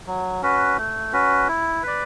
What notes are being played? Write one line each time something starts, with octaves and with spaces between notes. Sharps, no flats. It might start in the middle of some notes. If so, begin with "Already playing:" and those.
F#3
C#4 F#4 B4
A3
C#4 F#4 B4
E4
B4 D5